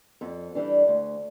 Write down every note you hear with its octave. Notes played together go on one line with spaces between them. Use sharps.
F2 A4
E3 G3 D4
D2